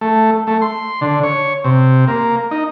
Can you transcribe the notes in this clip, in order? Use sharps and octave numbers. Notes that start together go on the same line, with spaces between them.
A3
A3
C6
D3
C#5
C3
A#3
D#4